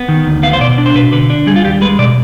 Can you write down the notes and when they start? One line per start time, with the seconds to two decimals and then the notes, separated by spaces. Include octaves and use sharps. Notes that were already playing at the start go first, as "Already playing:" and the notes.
Already playing: B3
0.09 D#3
0.26 D2
0.43 B3 F5
0.53 C5
0.60 B2 D5
0.78 D4
0.86 C5
0.95 B2 B4
1.13 D3 B4
1.30 D4
1.46 G3 G#4
1.56 F4
1.64 D#2 G4
1.81 G#3 B4
1.99 B2 D5